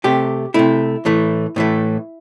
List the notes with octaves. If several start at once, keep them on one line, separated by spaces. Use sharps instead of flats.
C3 A3 G4
C3 A3 E4
A2 E3 A3
A2 E3 A3